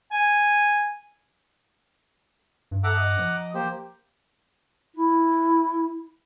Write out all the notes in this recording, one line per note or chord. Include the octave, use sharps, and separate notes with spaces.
G#5
G2
A4 E5 F#5 A#5 D6
D#5
F3
A#3 G4 C5
E4